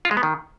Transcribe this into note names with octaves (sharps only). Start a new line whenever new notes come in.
F4
G#3
B3
D#3